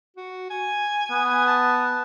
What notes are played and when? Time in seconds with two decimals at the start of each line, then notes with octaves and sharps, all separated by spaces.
0.17 F#4
0.50 G#5
1.11 B3
1.48 A5